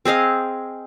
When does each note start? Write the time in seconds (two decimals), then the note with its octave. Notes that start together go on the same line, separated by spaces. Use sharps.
0.05 C4 G#4 D#5 F5